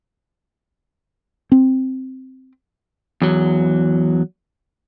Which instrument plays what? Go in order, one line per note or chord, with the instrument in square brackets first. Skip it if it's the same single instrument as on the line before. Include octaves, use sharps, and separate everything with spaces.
[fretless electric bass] C4
[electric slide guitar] E2 F#3